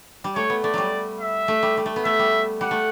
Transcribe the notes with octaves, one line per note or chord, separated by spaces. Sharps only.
G3
A3 C#5
B3
A3 D5
F#3 G3
E5
A3
G3
G3
A3
B3
A3 E5
G3
G3 F#5
A3